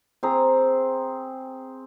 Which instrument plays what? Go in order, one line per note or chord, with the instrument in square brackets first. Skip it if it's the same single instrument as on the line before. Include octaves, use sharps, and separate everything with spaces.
[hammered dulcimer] C4 G#4 A#5